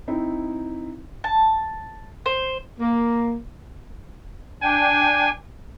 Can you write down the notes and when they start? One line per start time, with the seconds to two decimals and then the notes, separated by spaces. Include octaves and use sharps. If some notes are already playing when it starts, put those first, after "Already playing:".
0.08 C4 D#4 E4
1.24 A5
2.26 C5
2.80 A#3
4.62 D4 G5 G#5